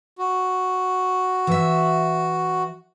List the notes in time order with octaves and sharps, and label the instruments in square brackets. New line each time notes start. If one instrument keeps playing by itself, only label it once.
[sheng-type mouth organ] F#4
[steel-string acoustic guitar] E3 E5